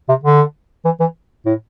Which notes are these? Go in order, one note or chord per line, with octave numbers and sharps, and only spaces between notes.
C3
D3
E3
E3
A2